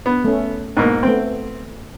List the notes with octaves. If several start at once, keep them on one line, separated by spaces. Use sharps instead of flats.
B3
A3 C#4
G#2 B2 A#3
A3 B3 C4 G5